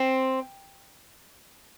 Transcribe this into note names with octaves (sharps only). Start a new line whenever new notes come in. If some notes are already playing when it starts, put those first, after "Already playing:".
Already playing: C4